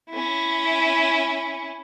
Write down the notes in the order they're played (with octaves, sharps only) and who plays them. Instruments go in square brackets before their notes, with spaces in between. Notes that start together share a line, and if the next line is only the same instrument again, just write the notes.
[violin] C#4 E4